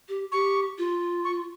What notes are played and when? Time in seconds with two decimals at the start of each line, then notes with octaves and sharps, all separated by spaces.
0.09 G4
0.32 G4 C#6
0.78 F4
1.24 C#6